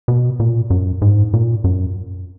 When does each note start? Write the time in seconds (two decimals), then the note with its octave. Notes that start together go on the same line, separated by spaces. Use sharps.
0.08 B2
0.40 A#2
0.70 F#2
1.02 G#2
1.34 A#2
1.64 F#2